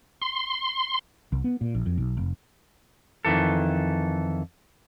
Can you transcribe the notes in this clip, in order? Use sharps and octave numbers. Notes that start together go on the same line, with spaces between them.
C6
C2
B3
A#2
A#1
F2
B1
F1
F2 D#3 E3 A4